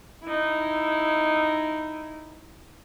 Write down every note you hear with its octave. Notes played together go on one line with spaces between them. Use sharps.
D#4 E4